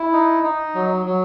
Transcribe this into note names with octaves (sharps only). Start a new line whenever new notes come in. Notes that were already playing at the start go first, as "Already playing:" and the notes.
Already playing: E4
D#4
D#4
F#3
F#3